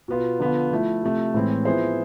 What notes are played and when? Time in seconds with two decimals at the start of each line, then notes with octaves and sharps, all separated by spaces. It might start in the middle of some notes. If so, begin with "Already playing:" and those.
0.08 B2 B3 F4
0.39 D3 F3 B3 F4
0.71 F3 A3 E4
1.03 C3 F3 A3
1.34 A2 E3 G#3 C4 E4
1.65 F3 B3 E4 G#4 C5